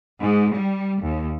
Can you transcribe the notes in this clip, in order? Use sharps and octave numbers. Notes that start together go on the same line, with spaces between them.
G#2
G3
D#2